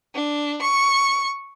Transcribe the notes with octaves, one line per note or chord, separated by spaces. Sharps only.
D4
C#6